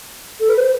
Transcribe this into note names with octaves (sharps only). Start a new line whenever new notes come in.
A4
B4
C5